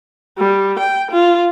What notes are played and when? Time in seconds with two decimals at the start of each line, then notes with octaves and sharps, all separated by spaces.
0.38 G3
0.79 G5
1.11 F4